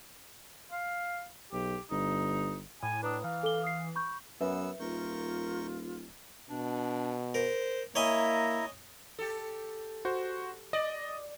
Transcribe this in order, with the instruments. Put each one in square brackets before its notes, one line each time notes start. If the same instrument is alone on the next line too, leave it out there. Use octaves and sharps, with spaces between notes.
[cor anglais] F5
[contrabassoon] B1 [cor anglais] G4
[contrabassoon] G1 [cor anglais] D#4
[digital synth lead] A2 [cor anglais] G#5
[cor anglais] D4 [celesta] B4 A#5 D#6
[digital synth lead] E3 [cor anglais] F5
[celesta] A4 D6 G7
D#6 C7
B5 C#6 G6
[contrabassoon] F#2 [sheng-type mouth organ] B3 E6 [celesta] B4 E5
[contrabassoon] D#1 [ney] F4 [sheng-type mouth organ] A#4 C#6 G6
[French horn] B2 [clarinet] D4
[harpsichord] A#4 [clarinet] C5
[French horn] A#3 [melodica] E4 A#5 [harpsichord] C#5 D#5 G#5 [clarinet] E5
[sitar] G4 A4
[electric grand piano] F#4 C5
[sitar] D5 [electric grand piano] D#5